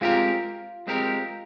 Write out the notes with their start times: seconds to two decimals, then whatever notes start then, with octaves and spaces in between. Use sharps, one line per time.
0.01 G#3 C4 F4 G4 A#4
0.87 G#3 C4 G4 A#4